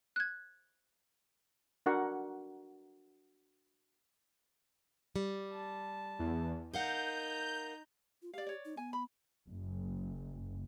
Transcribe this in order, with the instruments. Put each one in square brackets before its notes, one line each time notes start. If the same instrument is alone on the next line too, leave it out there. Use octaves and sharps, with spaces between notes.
[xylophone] F#6 G#6
[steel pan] D4 F#4 A#4 F#5 C#6
[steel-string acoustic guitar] G3
[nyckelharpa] A5
[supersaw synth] E2
[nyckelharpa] D#4 A#5 [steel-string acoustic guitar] A#4 F5 F#5 [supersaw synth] G6
[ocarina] F4
[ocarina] G4 [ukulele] D5 F5
[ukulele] C#5 D5
[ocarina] D#4
[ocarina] B3 [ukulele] G#5
[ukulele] B5
[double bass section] F#1